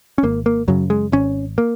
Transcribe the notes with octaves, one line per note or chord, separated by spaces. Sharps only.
C#4
G#1 A#3
A#3
F#2 C#3 F#3
G#3
G#1 C#4
A#3